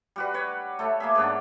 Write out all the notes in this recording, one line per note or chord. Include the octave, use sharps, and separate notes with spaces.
G3 F#4 B4
B4 C#5
A3 A4 C#5
A#3 G#4 E5
G#2 B3 D4